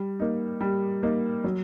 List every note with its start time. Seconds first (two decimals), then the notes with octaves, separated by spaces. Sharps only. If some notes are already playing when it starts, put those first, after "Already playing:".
Already playing: G3
0.19 A#3 D#4
0.61 G3
1.02 A#3 D#4
1.44 F#3